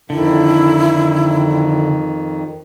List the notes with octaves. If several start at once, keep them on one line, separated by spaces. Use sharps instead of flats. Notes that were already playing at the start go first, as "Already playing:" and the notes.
F2 D3 D#3 E4